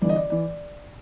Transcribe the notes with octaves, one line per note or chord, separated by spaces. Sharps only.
G1 G2 E3 D5
D#5
D5
E3 D5